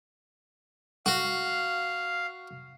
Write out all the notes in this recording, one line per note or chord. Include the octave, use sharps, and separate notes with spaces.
F#4 F5